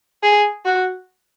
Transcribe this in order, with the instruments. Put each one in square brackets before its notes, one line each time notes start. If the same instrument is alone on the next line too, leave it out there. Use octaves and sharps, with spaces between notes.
[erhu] G#4
F#4